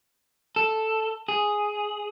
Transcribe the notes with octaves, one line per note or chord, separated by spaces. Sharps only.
A4
G#4